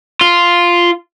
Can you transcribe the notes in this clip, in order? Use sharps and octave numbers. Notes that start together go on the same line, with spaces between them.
F4